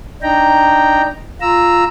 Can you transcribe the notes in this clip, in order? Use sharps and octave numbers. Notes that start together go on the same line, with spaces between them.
D4 D#4 G5 A#5
F4 A#5 E6